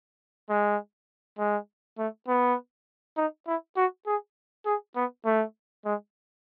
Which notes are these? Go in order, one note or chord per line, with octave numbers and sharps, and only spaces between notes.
G#3
G#3
A3
B3
D#4
E4
F#4
G#4
G#4
B3
A3
G#3